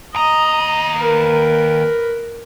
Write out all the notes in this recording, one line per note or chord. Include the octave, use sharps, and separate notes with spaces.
D#2 D#5 A#5 D#6
A#4 B4